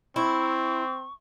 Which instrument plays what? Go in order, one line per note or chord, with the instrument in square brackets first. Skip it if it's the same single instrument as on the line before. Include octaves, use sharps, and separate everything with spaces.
[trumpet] C4 [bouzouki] E4 [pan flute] C#6